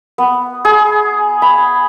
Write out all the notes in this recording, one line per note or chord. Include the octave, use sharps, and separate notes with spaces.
B3
G#4
B5